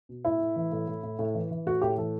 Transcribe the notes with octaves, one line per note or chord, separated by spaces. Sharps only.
B2
A2 E4
A2
E3
A2
A2
A2
A2
E3
E3
A2 F#4
A2 G4
E3 A4